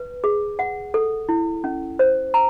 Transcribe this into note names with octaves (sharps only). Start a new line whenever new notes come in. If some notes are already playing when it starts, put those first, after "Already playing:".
Already playing: B4
G#4
F#5
A4
E4
C#4
C5
A#5